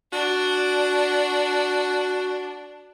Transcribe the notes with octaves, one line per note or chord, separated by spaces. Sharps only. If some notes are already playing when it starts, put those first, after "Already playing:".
D4 F#4